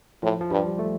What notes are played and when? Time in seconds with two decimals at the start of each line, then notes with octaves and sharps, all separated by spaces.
0.23 A2 F3
0.41 F3
0.51 G2 G3
0.79 A3